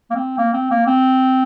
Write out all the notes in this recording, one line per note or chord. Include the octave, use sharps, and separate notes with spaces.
A#3
C4
A#3
C4
A#3
C4